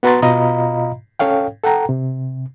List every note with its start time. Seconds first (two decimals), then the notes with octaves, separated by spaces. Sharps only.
0.03 B3 F#4 B4 A#5 C6 A6
0.22 B2 F4 D#5 F5 A#5 B5
1.19 C#4 A4 C#5 F5 G5
1.63 A4 F#5 G5 A#5
1.89 C3